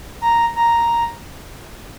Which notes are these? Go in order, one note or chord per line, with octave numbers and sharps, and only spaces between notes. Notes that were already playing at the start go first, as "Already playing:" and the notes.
A#5
A#5